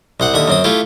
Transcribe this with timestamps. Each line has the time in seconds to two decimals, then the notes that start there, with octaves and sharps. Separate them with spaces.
0.20 C2 C5 F#5
0.34 D#2 D3 E5 D#6
0.48 F#2 C4 D#6
0.64 A3 E4 F4 G4